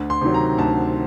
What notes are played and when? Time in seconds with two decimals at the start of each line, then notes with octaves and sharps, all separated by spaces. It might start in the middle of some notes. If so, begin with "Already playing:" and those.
Already playing: D2
0.10 C6
0.21 C3 D#3 F#3
0.34 A#5
0.58 D2 A5